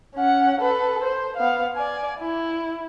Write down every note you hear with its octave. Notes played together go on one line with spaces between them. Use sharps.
C#4 F#5
A4 B4
C5
B3 F5
D5 G#5
E4